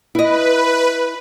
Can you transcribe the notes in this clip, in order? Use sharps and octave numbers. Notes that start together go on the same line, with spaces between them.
E4 B4 D#5